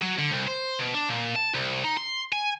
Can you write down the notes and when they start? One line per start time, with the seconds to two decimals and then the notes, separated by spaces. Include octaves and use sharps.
0.02 F#3
0.19 D3
0.31 C2
0.48 C5
0.80 B2
0.95 D4
1.09 A#2
1.36 A5
1.54 C2
1.84 D#4
1.97 C6
2.33 G#5